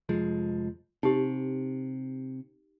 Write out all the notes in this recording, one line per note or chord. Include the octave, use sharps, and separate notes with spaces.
F1 F3 G#3
C3 D#4 G4